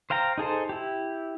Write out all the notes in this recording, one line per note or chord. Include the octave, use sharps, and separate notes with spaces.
C5 F5 G5 A#5
D#4 G#4 A4 C5
E4 G4